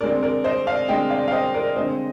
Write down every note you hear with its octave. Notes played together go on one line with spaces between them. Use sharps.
D3 G#3 C4 A#4 D5
A#4 D5
C5 D#5
D5 F5
D3 G#3 C4 D#5 G5
D5 F5
F5
C5 D#5
A#4 D5
D3 G#3 C4 C5 D#5